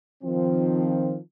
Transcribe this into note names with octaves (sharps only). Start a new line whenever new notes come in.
D#3 F3 C4